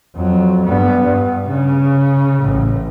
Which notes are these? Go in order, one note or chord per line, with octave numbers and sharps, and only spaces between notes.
F2 F#3
G2 B3
G2
C#3
A1 A2